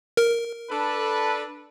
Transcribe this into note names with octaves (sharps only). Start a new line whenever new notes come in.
A#4
D4 A4 B4